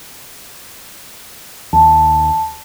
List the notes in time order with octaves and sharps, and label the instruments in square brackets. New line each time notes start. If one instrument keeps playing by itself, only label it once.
[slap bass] D#2 [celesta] A5